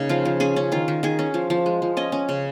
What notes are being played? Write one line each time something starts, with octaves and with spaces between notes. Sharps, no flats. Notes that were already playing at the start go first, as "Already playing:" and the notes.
Already playing: C#3 A#3 D#4
F3 F4
F3
C#4 G#4
C#4
D#3 F4
D#3
D#3 G#4
C#4
F3
F3
G#3
F3
C#4 D#5
C#4
C#3